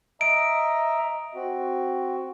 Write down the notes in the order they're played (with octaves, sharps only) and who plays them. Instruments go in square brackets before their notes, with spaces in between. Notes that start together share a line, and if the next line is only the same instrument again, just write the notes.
[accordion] D#5 E5 A#5 [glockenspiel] D7
[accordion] C4 F#4